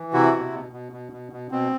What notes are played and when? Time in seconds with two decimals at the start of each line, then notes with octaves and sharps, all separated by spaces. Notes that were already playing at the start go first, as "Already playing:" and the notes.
Already playing: E3
0.13 C3 E4 F#4
0.33 B2
0.52 B2
0.72 B2
0.92 B2
1.12 B2
1.32 B2
1.51 B2 C4